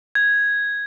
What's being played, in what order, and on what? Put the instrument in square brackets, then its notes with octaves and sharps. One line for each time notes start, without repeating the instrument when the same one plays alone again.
[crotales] G#6